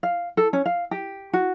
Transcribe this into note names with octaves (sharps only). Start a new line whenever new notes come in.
F5
A4
C#4
F5
G4
F#4